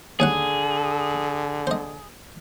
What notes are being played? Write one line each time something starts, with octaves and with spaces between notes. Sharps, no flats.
D#2 D3 C#4 G#4 F#5
C5 D#5